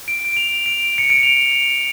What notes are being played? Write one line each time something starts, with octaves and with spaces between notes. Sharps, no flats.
D7
D7
F7
D7
C#7
D7
F7